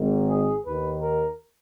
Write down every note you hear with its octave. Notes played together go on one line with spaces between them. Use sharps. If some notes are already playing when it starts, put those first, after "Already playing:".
Already playing: G#1 G#2 D#3
G#4
D#2 D#3 B4
A#4